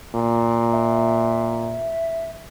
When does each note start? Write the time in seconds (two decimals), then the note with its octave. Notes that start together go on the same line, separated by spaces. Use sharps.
0.15 A#2
0.73 E5